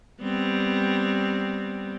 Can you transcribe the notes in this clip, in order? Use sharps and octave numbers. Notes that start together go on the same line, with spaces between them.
G3 B3 C4